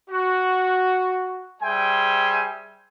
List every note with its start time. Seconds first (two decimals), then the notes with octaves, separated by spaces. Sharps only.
0.10 F#4
1.63 G3 G#4 C5 E5 G5 G#5